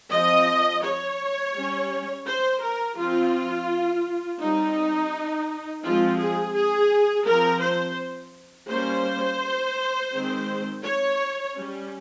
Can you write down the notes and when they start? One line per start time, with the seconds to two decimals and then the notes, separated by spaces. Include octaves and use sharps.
0.12 F3 C4 D#5
0.84 C#5
1.55 G3 C#4
2.27 C5
2.62 A#4
2.97 F3 C4 F4
4.40 G3 C4 D#4
5.83 F3 G#3 C4 F4
6.19 G#4
6.54 G#4
7.26 F3 C4 A#4
7.62 C5
8.69 G3 A#3 C#4 C5
10.12 D#3 G#3 C4
10.84 C#5
11.55 G3 C#4